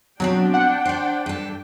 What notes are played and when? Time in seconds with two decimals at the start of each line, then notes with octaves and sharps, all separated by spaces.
0.20 B2 F3 F#3 C4 D4 G5
0.54 F#5
0.85 C5 D5
1.26 G2 A4